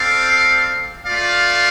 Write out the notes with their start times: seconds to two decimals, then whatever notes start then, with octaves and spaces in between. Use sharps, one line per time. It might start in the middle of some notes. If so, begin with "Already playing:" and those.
Already playing: C4 A4 D5 F5
1.05 A3 F4 D5 F5